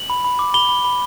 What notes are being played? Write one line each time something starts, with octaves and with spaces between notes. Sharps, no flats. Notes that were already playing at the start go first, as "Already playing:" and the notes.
Already playing: F#7
B5
B5
D6
B5 G7
B5
B5